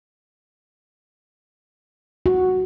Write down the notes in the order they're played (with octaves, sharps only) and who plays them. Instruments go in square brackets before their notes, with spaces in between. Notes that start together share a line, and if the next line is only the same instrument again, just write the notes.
[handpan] F#4